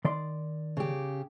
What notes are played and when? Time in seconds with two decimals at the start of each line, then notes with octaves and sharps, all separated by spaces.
0.05 D#3 D5 C6
0.77 C#3 G4